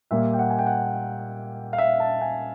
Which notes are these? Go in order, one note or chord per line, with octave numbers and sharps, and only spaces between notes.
A#2 G3 A#3 E5
G5
F#5
G#5
G5
F#5
F5
E5
A5
G#5